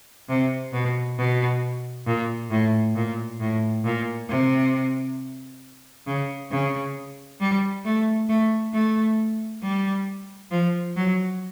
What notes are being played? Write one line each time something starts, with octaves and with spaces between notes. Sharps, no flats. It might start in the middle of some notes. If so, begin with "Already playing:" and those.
C3
B2
B2
A#2
A2
A#2
A2
A#2
C3
C#3
C#3
G3
A3
A3
A3
G3
F3
F#3